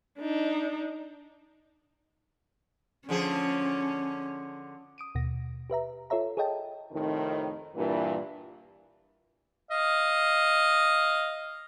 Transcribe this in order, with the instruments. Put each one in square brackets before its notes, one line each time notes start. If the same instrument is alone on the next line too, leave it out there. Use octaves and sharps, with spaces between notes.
[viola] D4 D#4
[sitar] D3 F3 G#4 [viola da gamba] C#4
[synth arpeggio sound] D#6 D7 D#7
D#2 B2 A#6
G4 B4 E5 A#5
F4 A4 C#5 E5 A#5
G#4 A4 C#5 D#5 G5 A5
[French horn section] F2 A2 C3 D#3
G2 A#2 E3
[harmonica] D#5 F5